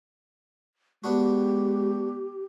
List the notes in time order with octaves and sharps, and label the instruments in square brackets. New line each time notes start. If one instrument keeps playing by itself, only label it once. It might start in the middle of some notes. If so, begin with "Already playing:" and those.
[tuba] G#3 [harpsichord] B3 D4 F#4 [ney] G4